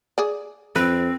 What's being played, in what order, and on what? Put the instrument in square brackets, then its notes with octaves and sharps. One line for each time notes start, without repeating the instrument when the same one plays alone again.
[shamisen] G#4 D5
[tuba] F2 [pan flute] C4 [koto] B4